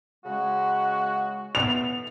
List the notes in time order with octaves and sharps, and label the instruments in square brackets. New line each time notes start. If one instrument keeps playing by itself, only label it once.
[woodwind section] C#3 G#3 [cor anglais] F#4
[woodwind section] E3 A3 B3 [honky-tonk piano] F7